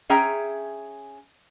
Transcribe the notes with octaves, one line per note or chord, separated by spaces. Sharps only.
C#4 G#4 E5 G5 A#5